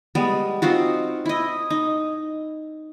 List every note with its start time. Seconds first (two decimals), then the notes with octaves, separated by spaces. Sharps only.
0.15 G3 G#3 B3
0.62 C4 D#4 F4 F#4
1.26 E4 D#5
1.70 D#4